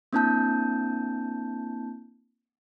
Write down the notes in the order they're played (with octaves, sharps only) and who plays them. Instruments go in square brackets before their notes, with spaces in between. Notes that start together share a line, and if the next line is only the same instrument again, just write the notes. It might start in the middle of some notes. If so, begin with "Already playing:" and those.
[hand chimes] A#3 C4 D4 E4 A5 G6